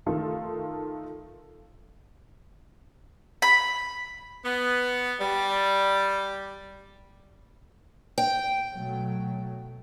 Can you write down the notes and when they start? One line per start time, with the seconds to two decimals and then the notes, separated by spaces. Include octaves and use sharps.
0.06 D#3 A3 F4 A4
3.42 B5
4.45 B3
5.21 G3
8.18 G5
8.71 B2 F#3 A3